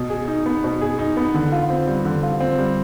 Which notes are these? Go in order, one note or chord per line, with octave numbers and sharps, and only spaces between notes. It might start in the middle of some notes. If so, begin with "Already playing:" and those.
Already playing: B2
G#4
D#4
B3
B2
G#4
D#4
B3
D3
F4
C4
G3
D3
F4
C4
G3